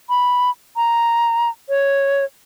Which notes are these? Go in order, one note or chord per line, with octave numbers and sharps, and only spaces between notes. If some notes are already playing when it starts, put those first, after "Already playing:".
B5
A#5
C#5